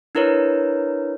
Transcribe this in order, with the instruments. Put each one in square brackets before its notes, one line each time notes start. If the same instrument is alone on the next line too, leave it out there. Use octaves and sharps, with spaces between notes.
[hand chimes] D4 E4 A#4 B4 C#5